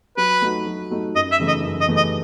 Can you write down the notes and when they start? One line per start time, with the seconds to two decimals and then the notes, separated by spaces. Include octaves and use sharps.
0.17 F#3 B4
0.42 A3 D#4 F#4
0.66 F#3
0.90 A3 D#4 F#4
1.15 F#2 D#5
1.32 E5
1.39 C#3 E3 A3 D#4
1.48 D#5
1.64 F#2
1.81 D#5
1.88 C#3 E3 A3 D#4
1.97 D#5